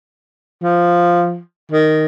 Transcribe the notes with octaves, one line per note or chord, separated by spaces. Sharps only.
F3
D#3